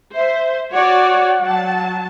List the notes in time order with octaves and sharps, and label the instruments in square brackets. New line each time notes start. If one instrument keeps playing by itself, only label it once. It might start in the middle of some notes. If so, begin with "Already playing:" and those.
[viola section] C5 [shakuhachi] E5
[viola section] F#4 C#5 D5 [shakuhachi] F#5
[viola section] F#3 A5